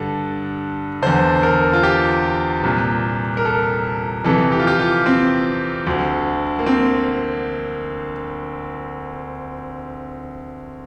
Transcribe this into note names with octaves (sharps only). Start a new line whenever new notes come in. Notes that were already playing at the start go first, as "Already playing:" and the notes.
Already playing: G2 D3 A4
E2 D3 C5
A#4
F4
G4
C2 A#2
A#4
A4
F2 C3 E3 A4
G4
F4
G4
F4
C4
D2 D3
A#3
C4